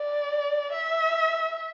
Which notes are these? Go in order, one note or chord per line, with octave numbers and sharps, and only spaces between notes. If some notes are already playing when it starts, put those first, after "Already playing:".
Already playing: D5
E5